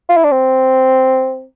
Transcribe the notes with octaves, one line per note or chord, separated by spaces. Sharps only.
F4
E4
D4
C4